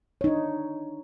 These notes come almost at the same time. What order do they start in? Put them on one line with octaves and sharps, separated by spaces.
C#5 D#4 D4